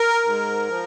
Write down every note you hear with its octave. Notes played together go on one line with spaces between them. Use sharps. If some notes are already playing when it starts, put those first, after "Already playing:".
Already playing: A#4
G#2
F3